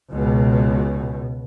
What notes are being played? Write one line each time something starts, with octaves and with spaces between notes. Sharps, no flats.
C#2 B2